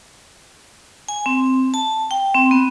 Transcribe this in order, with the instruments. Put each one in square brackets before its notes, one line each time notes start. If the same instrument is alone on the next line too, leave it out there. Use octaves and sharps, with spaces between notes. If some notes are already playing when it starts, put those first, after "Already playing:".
[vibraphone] G#5
C4
A5
G5
C4
B3